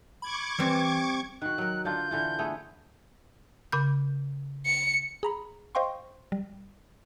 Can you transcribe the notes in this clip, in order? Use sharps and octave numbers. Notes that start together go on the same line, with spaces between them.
B5 C#6 D6 G#6
E3 G3 C4
D#3 F#4 F#6
F#3 A#4
D3 D4 F4 G6
D3 E3 F4
A3 B3 G#4
C#3 B5 G6
C#7
G#4 A#5 B5
C5 D#5 F5 G5 C6 C#6
G3